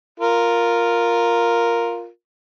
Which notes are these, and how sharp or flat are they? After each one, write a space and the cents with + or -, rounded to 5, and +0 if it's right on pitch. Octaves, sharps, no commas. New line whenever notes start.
F4 +0 A#4 +0